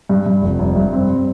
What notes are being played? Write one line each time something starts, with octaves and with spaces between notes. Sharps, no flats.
G2
G2
F1
F1
G2
C4